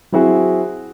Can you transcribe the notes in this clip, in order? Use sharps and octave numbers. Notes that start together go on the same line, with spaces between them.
F#3 C4 E4 F#4 G#4